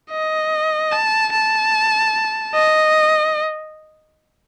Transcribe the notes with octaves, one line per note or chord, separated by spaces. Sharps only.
D#5
A5
A5
D#5